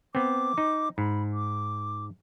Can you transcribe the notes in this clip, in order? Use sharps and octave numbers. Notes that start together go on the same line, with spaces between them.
B3 C4 D6
D#4
G#2 B5
D6